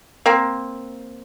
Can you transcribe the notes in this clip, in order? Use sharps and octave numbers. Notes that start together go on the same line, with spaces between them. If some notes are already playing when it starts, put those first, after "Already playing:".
A#3 C4